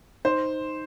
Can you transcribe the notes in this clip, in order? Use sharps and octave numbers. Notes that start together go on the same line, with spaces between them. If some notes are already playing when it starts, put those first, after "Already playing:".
D#4 C5